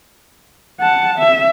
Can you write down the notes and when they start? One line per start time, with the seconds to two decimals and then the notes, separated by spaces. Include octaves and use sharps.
0.80 F#5 A5
1.18 E5